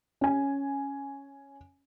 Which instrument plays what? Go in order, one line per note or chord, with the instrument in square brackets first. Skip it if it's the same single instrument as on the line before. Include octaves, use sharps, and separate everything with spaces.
[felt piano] C#4 G#5